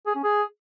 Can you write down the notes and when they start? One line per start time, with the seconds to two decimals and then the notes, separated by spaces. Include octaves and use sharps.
0.07 G#4
0.15 C#4
0.23 G#4